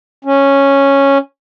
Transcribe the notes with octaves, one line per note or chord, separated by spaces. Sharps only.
C#4